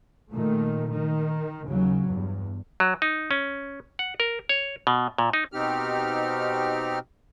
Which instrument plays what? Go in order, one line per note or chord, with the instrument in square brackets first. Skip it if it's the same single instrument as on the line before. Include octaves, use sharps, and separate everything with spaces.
[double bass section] A#2 D#3 A3
D#3
D#2 C#3 F#3
E2 G2
[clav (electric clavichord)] F#3
D#4
C#4
F#5
A#4
C#5
B2
A#2
D#4
[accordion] B2 C4 D#4 G4 F6